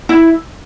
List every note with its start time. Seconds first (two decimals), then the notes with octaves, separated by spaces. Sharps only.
0.09 E4